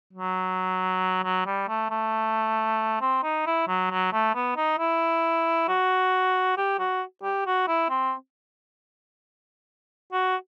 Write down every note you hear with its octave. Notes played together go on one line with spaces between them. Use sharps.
F#3
F#3
G3
A3
A3
C4
D#4
E4
F#3
F#3
A3
B3
D#4
E4
F#4
G4
F#4
G4
F#4
E4
C4
F#4